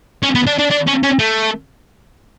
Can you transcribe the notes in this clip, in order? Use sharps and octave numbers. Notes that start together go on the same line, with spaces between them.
C#4
B3
D4
D4
D4
C#4
C#4
A3